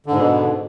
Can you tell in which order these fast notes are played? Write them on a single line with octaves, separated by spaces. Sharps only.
D3 G#2 B2